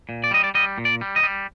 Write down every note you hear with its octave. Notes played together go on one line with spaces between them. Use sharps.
A#2
D5
G3 D#5
D5
G3 D#5
A#2
D5
G3
D#5
G3